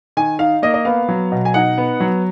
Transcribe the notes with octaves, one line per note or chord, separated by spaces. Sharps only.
D#3 G#5
D#4 F5
A#3 D#5
D#5
B3 F5
F#3
B2
G#5
D#4 F#5
B3
F#3